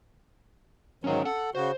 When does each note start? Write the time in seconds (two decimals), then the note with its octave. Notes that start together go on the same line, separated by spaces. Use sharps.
1.04 G#2 D#3 F#3 C#4 F5
1.25 A4 F#5
1.55 C#3 F#4 C5